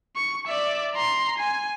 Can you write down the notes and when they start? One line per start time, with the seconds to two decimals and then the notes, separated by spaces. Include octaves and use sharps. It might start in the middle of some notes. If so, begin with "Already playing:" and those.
0.16 C#6
0.47 D5 E5
0.94 A#5 C6
1.38 G#5